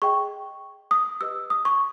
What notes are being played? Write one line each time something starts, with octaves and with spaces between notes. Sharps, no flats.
G#4 D#5 G5 C#6
D#6
G4 B4 D#5 E6
D#6
C#6